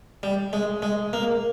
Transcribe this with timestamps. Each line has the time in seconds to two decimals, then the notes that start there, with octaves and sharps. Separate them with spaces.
0.23 G3
0.53 G#3
0.82 G#3
1.13 A#3